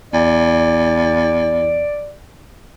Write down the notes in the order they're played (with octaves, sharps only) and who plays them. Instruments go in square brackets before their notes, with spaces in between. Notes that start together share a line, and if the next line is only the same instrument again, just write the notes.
[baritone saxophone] E2 [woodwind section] D5